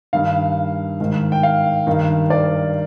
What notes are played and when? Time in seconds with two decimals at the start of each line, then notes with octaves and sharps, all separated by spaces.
0.13 G2 D#3 F5
1.00 G#2 D#3
1.32 G5
1.43 F5
1.87 G2 D#3
2.30 D5